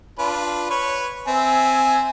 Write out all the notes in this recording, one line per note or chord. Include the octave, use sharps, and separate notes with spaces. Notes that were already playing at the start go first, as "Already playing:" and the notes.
D4 F4 B4
B4 C#5
C4 E5 G#5